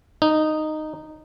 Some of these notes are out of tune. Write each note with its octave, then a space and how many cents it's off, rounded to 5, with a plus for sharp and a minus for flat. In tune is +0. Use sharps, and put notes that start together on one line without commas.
D#4 -10